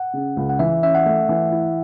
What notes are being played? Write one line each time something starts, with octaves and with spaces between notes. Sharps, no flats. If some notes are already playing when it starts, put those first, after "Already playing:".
Already playing: F#5
C#3
C#2
F#5
E3 E5
C#4 E5
F#5
A3 E5
E3
E4